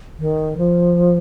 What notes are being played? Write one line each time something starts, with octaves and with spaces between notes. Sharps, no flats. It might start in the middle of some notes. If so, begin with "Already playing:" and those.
D#3
F3